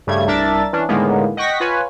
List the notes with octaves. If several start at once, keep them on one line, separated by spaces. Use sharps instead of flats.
G2 C#3 G3 A3 G#6
C2 D4 A#4 E5 A6
E3 C#4 D4
A2 D3 D#3 G#3 A#3 B3
D#5 F#5 G5 C#6 A#6 B6
F4 B4 C#5 G#5